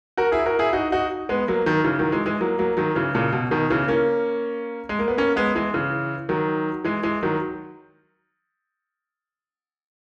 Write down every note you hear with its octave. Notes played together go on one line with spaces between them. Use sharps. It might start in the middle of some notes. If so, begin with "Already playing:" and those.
F#4 A#4
E4 G#4
F#4 A#4
E4 G#4
D#4 F#4
D#4 F#4
G#3 B3
F#3 A#3
D#3 F#3
C#3 E3
D#3 F#3
E3 G#3
E3 G#3
F#3 A#3
F#3 A#3
D#3 F#3
C#3 E3
A#2 C#3
B2
B2 D#3
C#3 E3
A#3 C#4
G#3
A#3
B3
A#3 C#4
G#3 B3
E3 G#3
C#3 E3
D#3 F#3
E3 G#3
E3 G#3
D#3 F#3